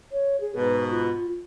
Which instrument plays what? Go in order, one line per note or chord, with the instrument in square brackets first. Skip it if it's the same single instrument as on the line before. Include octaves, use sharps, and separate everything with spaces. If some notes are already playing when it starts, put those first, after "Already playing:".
[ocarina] C#5
G#4
[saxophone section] G#2 B2 [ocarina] B4
[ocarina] F4